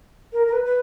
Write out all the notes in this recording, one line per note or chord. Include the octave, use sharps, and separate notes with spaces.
A#4
A#4
B4
B4